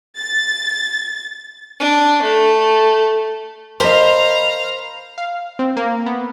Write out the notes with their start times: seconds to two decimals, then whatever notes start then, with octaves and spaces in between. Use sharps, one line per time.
0.20 A6
1.80 D4
2.22 A3
3.80 A#4 C5 D#5 F5 A#5 B5
5.18 F5
5.59 C4
5.77 A#3
6.06 B3